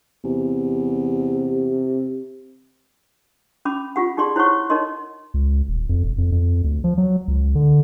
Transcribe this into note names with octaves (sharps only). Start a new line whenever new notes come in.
E2 C3
C#4 B5 D6
F4 G4 F#5
D#4 G4 G#4 D5 C6
E4 C5 C#5 F#5 C#6
D#4 A#4 C#5 D#5 C6
C#2
D#1
F2
E1
F2
F2
D2
F3
F#3
C#2
D3